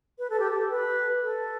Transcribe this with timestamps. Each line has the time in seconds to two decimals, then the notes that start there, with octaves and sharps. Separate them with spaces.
0.19 B4
0.30 A4
0.40 G4
0.51 A4
0.71 B4
1.22 A4